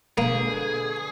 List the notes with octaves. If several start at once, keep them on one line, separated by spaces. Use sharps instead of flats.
B2 D3 A#3 G#4